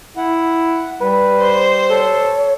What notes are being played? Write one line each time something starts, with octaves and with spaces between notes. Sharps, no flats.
E4 F#5
G3 B4
C5
A4 C#5